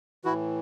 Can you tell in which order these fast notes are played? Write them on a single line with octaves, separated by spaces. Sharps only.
E3 E4 F#4 A2